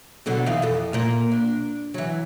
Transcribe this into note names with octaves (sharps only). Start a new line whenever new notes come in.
B2 D3 F#3
E3 D#4 F5
F2 A4
A#2 A#3
D4
E3 F#3